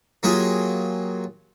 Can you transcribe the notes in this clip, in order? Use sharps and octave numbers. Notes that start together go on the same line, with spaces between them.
F#3 A#3 F4 G4 G#4